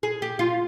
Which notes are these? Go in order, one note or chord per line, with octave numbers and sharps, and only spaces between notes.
G#4
G4
F4